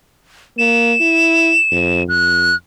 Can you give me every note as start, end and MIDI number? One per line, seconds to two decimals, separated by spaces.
0.58 0.95 58
0.58 2.03 100
1.01 1.55 64
1.72 2.03 41
2.09 2.52 41
2.09 2.56 90